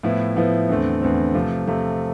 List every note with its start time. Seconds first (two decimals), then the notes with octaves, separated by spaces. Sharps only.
0.03 A2 F3 B3 E4
0.36 A2 F3 B3 E4
0.69 E2 D3 A3 C4
1.02 E2 D3 A3 C4
1.34 C3 F3 A3
1.67 C3 F3 A3